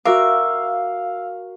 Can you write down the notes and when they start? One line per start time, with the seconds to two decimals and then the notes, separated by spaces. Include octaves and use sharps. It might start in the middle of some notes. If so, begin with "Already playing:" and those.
0.05 F#4 A#4 E5 F5 D6